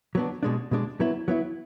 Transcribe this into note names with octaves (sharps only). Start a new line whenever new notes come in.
F#3 B3 D4
B2 G#3 D4
B2 G#3 D4
F#3 B3 E4
F#3 B3 E4